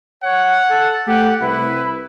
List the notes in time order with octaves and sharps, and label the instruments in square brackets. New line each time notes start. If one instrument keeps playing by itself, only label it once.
[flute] C#5 [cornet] F#5
[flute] A4
[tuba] A3 [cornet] G4 [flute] F#5
[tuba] C2 [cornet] E4 [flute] B4